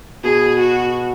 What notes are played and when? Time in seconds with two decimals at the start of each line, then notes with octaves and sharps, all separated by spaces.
0.24 B2 G#4
0.59 F#4